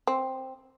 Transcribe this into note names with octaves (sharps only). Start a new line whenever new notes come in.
C4